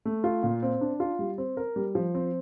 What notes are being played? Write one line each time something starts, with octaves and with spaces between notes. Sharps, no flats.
A3
F4
A#2
C4
D4
F4
G3
C4
A#4
G3
F3
C4